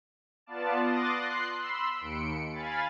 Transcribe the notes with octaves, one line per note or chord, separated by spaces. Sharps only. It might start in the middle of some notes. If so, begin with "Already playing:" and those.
B3 F4 D5 A5
C6 D6 D#6 F#6 A6 A#6
C6 F#6 C7
B5 C6 E6
D#2 C#7 D7
F5 G#5 B5 A6